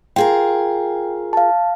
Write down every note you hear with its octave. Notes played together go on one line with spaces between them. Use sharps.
F4 G#4 A#4 G5
F5 A5